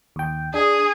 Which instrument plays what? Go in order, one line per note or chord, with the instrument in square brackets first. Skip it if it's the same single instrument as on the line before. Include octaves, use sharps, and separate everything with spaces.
[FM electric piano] D#2 G5
[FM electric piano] D4 [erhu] G#4